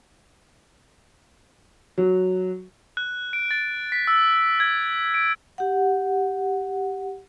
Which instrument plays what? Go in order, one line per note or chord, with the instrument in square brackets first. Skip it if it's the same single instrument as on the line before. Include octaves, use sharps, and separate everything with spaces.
[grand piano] F#3
[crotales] F#6
D7
A6
B6
E6
G#6
D7
[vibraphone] G4 F#5